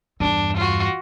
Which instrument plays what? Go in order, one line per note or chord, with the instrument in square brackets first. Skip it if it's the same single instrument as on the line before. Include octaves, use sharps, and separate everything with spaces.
[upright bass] E2 G2 [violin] D4
[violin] F4 F#4